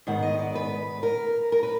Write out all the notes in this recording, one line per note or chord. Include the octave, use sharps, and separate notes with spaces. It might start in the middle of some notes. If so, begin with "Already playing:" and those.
G#2 D#3 G#3 B3 F#5
D#5
D5
B4
A#4
A#4
B4